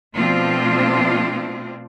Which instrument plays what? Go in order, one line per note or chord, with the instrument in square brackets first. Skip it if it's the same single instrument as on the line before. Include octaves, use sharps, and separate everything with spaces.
[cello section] B2 F3 A3 C4 D4 F4